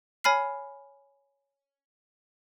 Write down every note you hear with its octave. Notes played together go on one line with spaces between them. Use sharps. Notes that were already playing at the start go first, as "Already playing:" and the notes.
C#5 G#5 B5 F6 C7